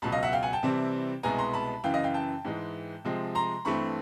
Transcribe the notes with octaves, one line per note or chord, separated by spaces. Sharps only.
C#2 B2 F#3 A5 B5
D#5 F5
E5 F#5
F5 G5
F#5 G#5
G5 A5
C3 E3 G3 C4 E4
C2 B2 G#3 B3 G#5 A#5
A#5 C6
A5 B5
F#2 C#3 E3 F5 G5
D#5 F5
F5 G5
G5 A5
G#2 E3 G#3
C3 F3 G#3 C4
A#5 C6
G2 E3 A3 C4 B5 C#6